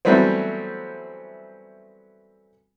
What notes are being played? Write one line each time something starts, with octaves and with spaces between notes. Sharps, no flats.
E3 F#3 G3 A3 B3 C4